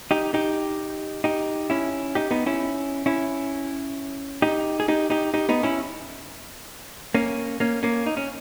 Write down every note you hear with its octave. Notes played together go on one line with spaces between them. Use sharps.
D#4 G4
D#4 G4
D#4 G4
C#4 E4
D#4 G4
B3 D#4
C#4 E4
C#4 E4
D#4 G4
G#4
D#4 G4
D#4 G4
D#4 G4
B3 D#4
C#4 E4
A#3 C#4
A#3 C#4
A#3 C#4
D#4
C#4